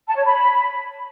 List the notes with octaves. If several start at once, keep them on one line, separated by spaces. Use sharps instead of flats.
A5
C#5
B5